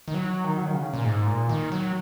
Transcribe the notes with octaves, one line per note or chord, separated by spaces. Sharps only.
D#3
F#3
D#3
F#3
D#3
C#3
A#2
G#2
A#2
D#3
F#3